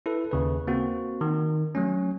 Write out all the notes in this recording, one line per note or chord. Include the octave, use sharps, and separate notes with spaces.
E4 A4 B4
D#2 C#3 B4
A#3 C4 F#4
D#3
F#3 A3 C#4